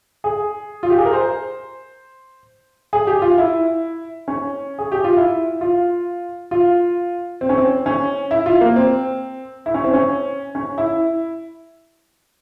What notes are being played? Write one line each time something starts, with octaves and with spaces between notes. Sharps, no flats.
G#4
F4
G4
G#4
A#4
C5
G#4
G4
F4
E4
C#4
G#4
G4
F4
E4
F4
F4
C4
C#4
C4
C#4
E4
F4
A#3
C4
E4
C#4
C4
C#4
C#4
E4